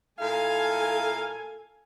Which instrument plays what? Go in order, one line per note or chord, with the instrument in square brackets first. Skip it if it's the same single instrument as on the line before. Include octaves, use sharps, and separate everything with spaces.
[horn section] A#2 E4 F5 [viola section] A4 G#5